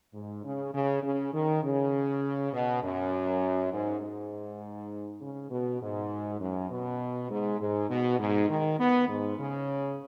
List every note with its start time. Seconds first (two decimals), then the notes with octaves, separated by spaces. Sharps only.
0.14 G#2
0.44 C#3
0.74 C#3
1.03 C#3
1.34 D#3
1.63 C#3
2.53 B2
2.83 F#2
3.72 G#2
4.02 G#2
5.21 C#3
5.51 B2
5.81 G#2
6.40 F#2
6.71 B2
7.30 G#2
7.60 G#2
7.90 B2
8.20 G#2
8.50 D#3
8.80 B3
9.09 G#2
9.38 C#3